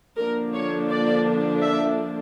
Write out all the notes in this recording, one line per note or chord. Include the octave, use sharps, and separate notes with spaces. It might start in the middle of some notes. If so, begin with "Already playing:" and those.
D3 F3 A#3 D4 A#4
C#5
D5
E5